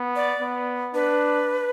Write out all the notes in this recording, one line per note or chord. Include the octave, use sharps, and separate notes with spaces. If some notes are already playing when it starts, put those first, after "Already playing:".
Already playing: B3
D5
B3
D4 B4